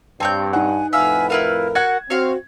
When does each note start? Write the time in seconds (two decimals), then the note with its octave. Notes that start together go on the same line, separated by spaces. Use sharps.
0.20 G2 C4 C#5 G5 A5 G6
0.53 D#4 F#5 G#5
0.93 F2 A2 B4 E5 F5 G#5
1.30 E4 F4 A#4 F5
1.75 F#4 F#5 G#6
2.10 C4 F#4 C#5 F5